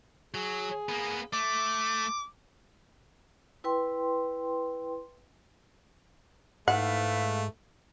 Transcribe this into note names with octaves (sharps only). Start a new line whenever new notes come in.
F#3 G#4
A#3 B3
A3 D6
E4 B4 G5 C6
G#2 A3 E4 B4 F5 F#5